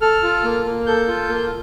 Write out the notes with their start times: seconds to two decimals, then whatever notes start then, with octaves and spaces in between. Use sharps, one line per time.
0.01 A4 F6
0.23 F4
0.44 A#3
0.65 A#3
0.86 A4 G6
1.08 F4
1.29 A#3